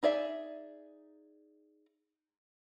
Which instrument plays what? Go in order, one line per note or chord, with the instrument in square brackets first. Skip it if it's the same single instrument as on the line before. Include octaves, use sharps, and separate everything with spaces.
[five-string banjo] D#4 G#4 D5 E5